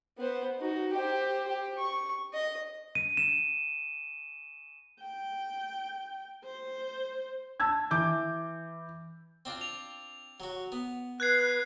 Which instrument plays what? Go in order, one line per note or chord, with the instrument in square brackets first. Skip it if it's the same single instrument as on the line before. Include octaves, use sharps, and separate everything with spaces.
[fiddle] B3 C5
D#4 F#4
G4 C5
G4
C#6
D#5
[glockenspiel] D#7
E7
[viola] G5
C5
[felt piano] A5 E6 G#6
E3 D6 G6
[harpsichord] C4 D4 F4
[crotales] F7
[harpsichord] F#3 F#4
B3
[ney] B4 [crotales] F#6 G#6 C7